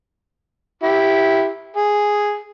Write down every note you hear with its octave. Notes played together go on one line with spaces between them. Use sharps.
E4 G4
G#4